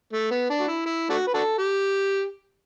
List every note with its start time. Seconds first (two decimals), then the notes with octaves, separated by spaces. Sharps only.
0.13 A3
0.31 B3
0.50 D4
0.60 F#4
0.68 E4
0.86 E4
1.10 A3 D4 F#4
1.27 B4
1.34 D4 F#4 A4
1.58 G4